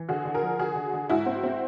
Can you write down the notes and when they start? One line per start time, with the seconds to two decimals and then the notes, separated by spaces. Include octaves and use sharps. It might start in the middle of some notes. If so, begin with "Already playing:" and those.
Already playing: E3
0.09 D3 F#4 G#4
0.25 D3
0.34 G#4 A#4
0.42 F3
0.59 D3 F#4 G#4
0.76 D3
0.94 D3
1.09 G#2 E4 F#4
1.26 C4
1.43 C4